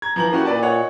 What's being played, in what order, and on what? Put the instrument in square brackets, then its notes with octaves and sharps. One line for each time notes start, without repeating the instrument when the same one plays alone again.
[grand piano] A#5 G#6
[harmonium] E3 [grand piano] F3 A#5 F#7
[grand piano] A#3 C#4 F#4 [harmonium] E4 G4
[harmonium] A#2 [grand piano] B4 D5 A5
[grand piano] D#4 C#5 F#5